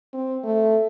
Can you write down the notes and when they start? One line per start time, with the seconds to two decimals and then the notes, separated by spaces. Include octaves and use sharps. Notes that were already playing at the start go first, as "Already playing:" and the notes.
0.13 C4
0.44 A3